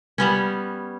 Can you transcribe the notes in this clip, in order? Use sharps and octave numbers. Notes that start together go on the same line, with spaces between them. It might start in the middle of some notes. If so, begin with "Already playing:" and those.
G3 B3 C#4